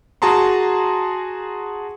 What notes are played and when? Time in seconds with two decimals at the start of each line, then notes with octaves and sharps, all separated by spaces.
0.22 F#4 G#4 A5 A#5 C6